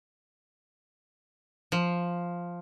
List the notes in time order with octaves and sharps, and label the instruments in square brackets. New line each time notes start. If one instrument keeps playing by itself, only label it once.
[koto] F3